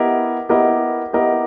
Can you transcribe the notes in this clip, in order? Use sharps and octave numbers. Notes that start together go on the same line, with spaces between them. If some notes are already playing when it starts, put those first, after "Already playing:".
Already playing: B3 E4 G4 A#4 D#5
B3 E4 G4 A#4 D#5
B3 E4 G4 A#4 D#5